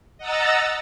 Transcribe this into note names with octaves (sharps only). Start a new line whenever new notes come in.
D#5 F#5 A#5 E6 A6